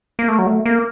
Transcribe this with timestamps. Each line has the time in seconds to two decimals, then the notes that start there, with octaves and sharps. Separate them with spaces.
0.19 A#3
0.28 A3
0.39 F#3
0.46 A3
0.66 A#3